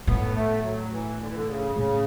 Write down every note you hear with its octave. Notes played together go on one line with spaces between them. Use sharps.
A2 B3
A3
F#3
E3
D3
E3
D3
C#3
A2 C#3